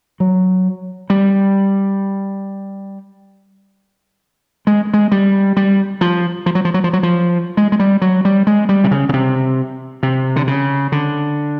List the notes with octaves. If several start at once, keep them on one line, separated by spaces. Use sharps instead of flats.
F#3
G3
G#3
G#3
G3
G3
F3
F3
F#3
F3
F#3
F3
F#3
F3
G#3
G#3
G3
F#3
G3
G#3
G3
C3
C#3
C#3
C3
C3
D3
C#3
D3